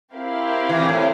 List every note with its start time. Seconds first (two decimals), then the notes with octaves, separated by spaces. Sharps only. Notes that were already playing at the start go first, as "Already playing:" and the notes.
0.14 C4 E4 G4 A#4 F5
0.69 E3
0.80 A#2
0.89 A2